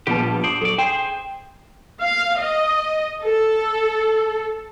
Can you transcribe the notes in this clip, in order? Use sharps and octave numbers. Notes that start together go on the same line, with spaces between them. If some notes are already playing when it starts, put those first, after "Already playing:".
A#1 F3 G3 B3 G4 A5
C5 D5 D#6
F#3 A4 D5
G#4 C5 G5
F5
D#5
A4